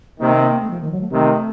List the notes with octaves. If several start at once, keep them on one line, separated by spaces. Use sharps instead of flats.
C3 D#3 A#3
C4
A#3
A3
F3
D#3
F#3
A3
C3 D#3 A3